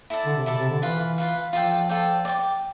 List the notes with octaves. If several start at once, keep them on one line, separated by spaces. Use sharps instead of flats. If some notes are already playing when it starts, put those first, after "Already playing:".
E4 A4 D5 A5
D3
C3
B2 E4 A4 D5 A5
C3
D3
E3 F4 B4 F5
F4 B4 F5
F3 F4 A4 D5 G5
F4 A4 D5 G5
D5
G5 D6